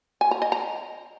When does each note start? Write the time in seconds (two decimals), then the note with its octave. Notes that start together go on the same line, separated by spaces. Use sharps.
0.21 G#5
0.31 A#5
0.42 D#5
0.52 A#5